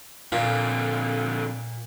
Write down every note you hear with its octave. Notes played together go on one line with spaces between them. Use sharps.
F2 A#2 D3 F4